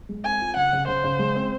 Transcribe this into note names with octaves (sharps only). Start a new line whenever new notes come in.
G#3
C4 G#5
F4
C#3 F#5
C#3
C#3 C5
C#3
G#3
C4